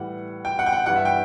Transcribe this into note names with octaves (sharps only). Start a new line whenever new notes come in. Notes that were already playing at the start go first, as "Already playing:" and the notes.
Already playing: A2 E3 G3 F#5
G5
F#5
G5
F#5
G2 E3 G3 F#5
E5
G5